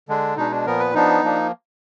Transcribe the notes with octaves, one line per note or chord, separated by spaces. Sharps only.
D3 G#3 D4
B2 G#3 D4 D#4
D4
A#2 F3 B3 A#4
B4
F3 B3 D4 D#4
F3 A#3 D4